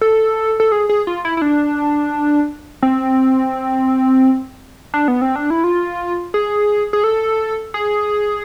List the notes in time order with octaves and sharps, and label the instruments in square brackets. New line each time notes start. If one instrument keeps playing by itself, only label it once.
[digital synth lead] A4
A4
G#4
G#4
F4
E4
E4
D4
C4
D4
B3
C4
D4
E4
F4
G#4
G#4
A4
G#4